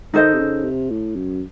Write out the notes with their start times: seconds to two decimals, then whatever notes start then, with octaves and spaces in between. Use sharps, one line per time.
0.14 D#3 D#4 A4 C5 D#5
0.34 C3
0.39 C#3
0.65 C3
0.90 A2
1.16 F#2